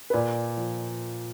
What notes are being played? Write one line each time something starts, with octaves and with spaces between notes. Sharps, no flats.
B4
A#2 D5
F3